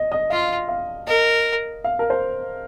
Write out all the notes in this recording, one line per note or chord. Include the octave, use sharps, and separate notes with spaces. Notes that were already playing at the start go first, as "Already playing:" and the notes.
Already playing: D#5
D#5
F4 F5
F5
A#4 D#5
F5
A#4
C5